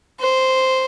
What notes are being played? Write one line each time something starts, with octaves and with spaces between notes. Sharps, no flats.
C5